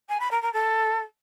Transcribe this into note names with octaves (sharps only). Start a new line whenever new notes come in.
G#5
B5
A#4
A#4
A4